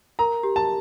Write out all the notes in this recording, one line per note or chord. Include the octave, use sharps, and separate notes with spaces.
A#4 A#5
G4
A5